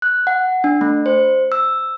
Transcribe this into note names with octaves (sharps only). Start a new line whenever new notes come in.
F#6
F#5
D4
A3
C5
E6